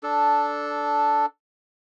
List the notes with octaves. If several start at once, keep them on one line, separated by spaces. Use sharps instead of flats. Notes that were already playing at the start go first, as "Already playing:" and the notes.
D4 A4